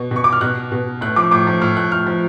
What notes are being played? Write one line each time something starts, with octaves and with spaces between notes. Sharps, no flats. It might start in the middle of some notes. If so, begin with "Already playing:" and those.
Already playing: B2
B2
C#6
D6
F6
B2 F#6
B2
A2 F#6
F3 D6
A2 D6
F3
A2 F6
F3 F#6
A2 F6
F3